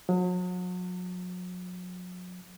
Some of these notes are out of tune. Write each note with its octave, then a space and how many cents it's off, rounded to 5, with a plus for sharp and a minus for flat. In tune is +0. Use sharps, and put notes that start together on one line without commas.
F#3 -40